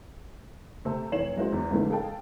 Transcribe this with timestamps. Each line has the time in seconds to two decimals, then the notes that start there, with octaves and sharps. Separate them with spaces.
0.85 C3 A3 C4 A4
1.12 F1 E3 C#5 C7 E7 F#7
1.37 F#2 G#3 E4 F#4 C5
1.52 E2
1.71 G#2 C#3 E3 F3 A3
1.90 G#4 A4 F5 G5 A5